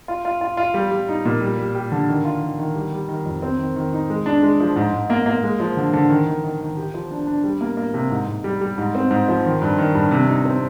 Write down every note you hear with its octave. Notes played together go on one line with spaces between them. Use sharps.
F4
F4
F4
F4
G3
G3
D#4
A#2
G3
G3
G4
D3
D#3
F4
D#3
D#3
G3
G3
D#3
F2
C4
D#3
D#3
D#4
G#3
D4
G#3
F3
G#2
G#2
A#3
A#3
G#3
F3
D3
D3
D#3
D#3
D#3
D#3
G4
F3
D4
D4
G3
A#3
A#3
C3
G#2
G#2
G3
G3
G#2
C4
G#2
F3
D#3
G2
D#3
G2
C3
D#4
C4